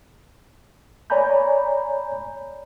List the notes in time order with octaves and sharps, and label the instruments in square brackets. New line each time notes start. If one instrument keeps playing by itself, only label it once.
[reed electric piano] C#5 D5 G#5 A#5 B5 G6